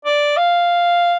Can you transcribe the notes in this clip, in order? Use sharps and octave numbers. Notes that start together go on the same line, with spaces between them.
D5
F5